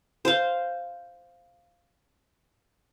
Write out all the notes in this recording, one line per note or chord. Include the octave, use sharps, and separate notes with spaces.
C5 F5